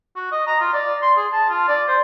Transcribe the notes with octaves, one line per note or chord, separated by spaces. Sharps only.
F#4
D#5
A#5
F4
D5
C6
G#4
A5
F4
D5
C5